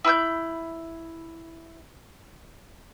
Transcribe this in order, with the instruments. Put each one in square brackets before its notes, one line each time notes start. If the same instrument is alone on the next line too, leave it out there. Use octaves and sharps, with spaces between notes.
[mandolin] E4 B5 E6 G6